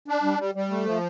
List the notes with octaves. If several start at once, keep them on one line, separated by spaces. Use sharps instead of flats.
D4
G3
G3
G3
A3
F3